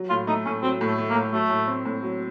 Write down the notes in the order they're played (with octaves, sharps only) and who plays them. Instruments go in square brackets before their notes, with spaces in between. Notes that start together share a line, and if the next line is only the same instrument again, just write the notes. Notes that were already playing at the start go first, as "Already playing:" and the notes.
Already playing: [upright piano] F#3
[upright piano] A2 [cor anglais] F4
[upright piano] A3 [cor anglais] D#4
[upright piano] A2 [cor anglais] C#4
[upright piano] F#3 [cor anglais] C4
[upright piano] A2
[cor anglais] A3
[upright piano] A3
[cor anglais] A#3
[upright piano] A2
[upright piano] F#3 [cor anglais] A3
[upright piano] A2
C4
A2
F#3